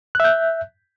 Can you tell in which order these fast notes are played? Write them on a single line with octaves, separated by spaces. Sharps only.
F#6 E5 G6